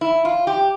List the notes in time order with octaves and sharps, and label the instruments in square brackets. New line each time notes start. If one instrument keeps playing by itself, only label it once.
[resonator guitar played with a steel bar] E4
F4
G4